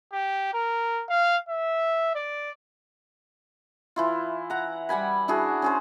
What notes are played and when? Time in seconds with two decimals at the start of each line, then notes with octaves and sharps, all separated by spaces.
0.13 G4
0.54 A#4
1.10 F5
1.49 E5
2.16 D5
3.96 E3 E4 F4
4.50 F#5 A#5
4.89 G3 F#5 G#5 B5
5.28 D4 E4 F#4 G#4
5.62 C#4 G#4 C5